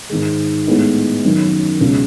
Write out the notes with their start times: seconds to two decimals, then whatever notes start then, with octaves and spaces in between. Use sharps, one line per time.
0.10 G#2 D#3 G#3
0.67 A2 G#3 B3 D#4
1.24 F#2 D#3 F#3 C#4
1.81 C#2 B2 G#3 C#4